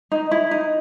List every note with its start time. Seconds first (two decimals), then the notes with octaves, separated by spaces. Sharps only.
0.12 D#4
0.31 E4
0.51 D#4